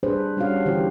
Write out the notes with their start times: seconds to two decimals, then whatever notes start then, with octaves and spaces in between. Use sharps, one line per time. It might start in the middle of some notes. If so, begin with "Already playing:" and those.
0.03 G3 D4 G#4 B4 C5
0.37 G3 C#4 D4 F#4 F5
0.66 D3 E3 G4 C5